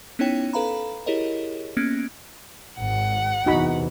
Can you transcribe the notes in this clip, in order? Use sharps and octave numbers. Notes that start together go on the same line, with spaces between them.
B3 C#4 D#4 E4 C#5 G5
A4 B4 F5 A#5 B5
E4 G4 G#4 A#4 C#5 D#5
A#3 B3 C#4 F#6 G#6 D7
G#1 F#5
E2 C3 E3 D#4 F#4 B5